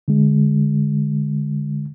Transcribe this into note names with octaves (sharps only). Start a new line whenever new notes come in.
D3 G#3